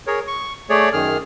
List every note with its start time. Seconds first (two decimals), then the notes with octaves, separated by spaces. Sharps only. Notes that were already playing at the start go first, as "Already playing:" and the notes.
0.07 G#4 A#4 C#5
0.27 C#6
0.70 A3 G#4 C#5 D5
0.93 F#2 D#3 G#4 F6